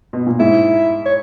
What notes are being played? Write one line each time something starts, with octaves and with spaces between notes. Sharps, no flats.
B2
A#2
G#2 E4
C#5